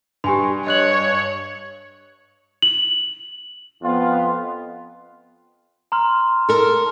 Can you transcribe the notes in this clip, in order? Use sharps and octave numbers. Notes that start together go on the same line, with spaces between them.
G2 G4 G#5 C6
C#5 D#5 F#6 F#7
F#7
F2 B3 F4
A#5 C6 F6
A4 A#4